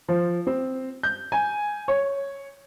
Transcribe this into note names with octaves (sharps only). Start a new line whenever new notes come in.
F3
C4
G6
G#5
C#5